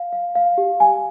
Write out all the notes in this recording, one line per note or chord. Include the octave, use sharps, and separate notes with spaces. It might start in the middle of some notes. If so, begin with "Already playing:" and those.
Already playing: F5
F5
F5
G4
G#5